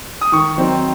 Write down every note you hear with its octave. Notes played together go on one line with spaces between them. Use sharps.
D#6
D#3 C#6
F#3 C4 D#4